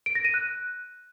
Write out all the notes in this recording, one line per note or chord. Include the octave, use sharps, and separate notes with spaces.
D7
A#6
D#7
F#6